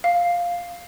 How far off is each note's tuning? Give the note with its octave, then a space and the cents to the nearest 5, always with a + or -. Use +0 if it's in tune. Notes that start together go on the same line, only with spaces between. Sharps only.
F5 +5